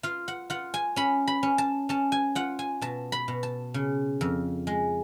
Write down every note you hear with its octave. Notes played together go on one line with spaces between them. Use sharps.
F4 F5
F#5
F4 F#5
G#5
C#4 B5
B5
C#4
A5
C#4 A5
G#5
F4 F#5
G#5
B2 A5
B5
B2
A5
C#3
F2
G#3